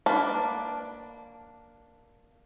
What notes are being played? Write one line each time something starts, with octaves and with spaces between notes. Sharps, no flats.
A#3 D4 B4 A5